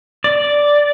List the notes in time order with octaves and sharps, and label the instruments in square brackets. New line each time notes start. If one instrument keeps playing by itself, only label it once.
[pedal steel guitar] D5